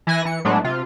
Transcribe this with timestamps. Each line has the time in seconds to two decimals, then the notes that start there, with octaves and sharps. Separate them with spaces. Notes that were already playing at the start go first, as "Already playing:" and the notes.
0.07 E3 E4 G#5 F#6 A#6
0.25 E3 C#7
0.45 A2 F#3 G#3 A3 B3 D4
0.64 C3 F4